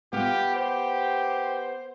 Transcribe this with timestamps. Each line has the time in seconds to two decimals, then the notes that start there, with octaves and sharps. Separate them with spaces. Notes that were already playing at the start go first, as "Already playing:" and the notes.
0.13 B3 F4 G4
0.56 G4 C5